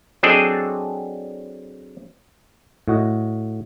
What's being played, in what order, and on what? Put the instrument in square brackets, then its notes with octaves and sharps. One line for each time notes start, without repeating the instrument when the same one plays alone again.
[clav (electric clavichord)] F#3 C4 D4 G#4 A4 D#5
A2 F#4 D#5